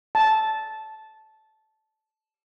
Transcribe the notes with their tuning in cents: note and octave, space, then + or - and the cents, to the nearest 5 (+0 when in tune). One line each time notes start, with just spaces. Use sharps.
A5 -10